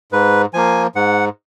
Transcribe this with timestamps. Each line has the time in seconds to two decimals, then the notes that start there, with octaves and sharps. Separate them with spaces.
0.12 G#2 B4
0.54 F3 A#3 G#5
0.95 G#2 F#5